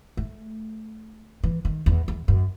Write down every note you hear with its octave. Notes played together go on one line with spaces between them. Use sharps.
A3
E3
D#3
E2
E2
F#2